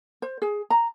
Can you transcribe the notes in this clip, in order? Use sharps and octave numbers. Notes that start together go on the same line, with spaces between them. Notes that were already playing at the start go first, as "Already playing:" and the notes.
C5
G#4
A#5